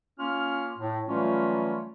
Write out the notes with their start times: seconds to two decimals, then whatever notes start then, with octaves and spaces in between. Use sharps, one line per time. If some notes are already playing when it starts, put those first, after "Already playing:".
0.19 A#3 C#4 F4 F6
0.79 A2
1.08 E3 F#3 G3 A3 C#4 F4